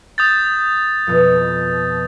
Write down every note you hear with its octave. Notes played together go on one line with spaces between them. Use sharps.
D#6 G6 A6
F2 B2 F3